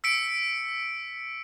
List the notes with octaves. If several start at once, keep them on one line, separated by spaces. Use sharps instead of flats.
E6 B6 C#7 D7